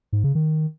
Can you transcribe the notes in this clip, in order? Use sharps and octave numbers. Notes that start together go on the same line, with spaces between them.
G#2
C#3
D#3